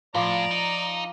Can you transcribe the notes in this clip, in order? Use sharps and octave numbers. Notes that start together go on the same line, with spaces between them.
A2 F3 D5 A#5 D6
D#4